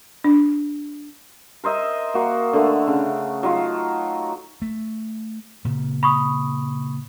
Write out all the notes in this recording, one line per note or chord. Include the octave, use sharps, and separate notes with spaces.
D4
A#4 C5 D#5 E5
A#3 F#4
D3 A3
C#3
F#3 D#4 F4
A3
A#2 C#3
B5 C#6 D#6